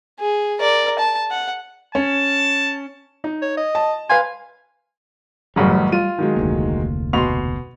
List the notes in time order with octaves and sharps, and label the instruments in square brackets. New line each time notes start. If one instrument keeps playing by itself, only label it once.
[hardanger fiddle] G#4
A#4 D5
A5
F#5
[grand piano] C#4 [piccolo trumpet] A5
[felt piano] D#4
[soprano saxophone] C#5
D#5
[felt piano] A5
[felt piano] B4 F5 C6 [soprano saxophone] G#5
[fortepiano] A1 F#2 C#3 [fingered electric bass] G3
[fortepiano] F4 [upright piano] D#7
[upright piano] D#3 F#3 G#3
[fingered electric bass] F1 D2 A#3
[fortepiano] B2 C6 [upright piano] F7